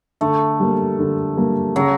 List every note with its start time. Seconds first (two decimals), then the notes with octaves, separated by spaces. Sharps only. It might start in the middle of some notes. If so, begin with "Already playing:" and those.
0.21 D3 A3
0.60 G3 A#3
0.99 D3
1.37 G3 A#3
1.76 C#3 F#3